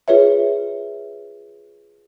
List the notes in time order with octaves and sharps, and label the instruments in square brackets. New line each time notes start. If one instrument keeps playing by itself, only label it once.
[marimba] F4 G#4 B4 C#5 E5